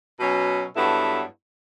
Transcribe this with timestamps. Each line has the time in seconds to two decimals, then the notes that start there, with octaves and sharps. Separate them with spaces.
0.18 B2 F#3 C#4
0.76 G2 F#3 B3 E4 A4